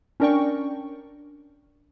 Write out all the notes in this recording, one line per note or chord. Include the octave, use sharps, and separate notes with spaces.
C#4 D4 A#4 D5 G5 C#6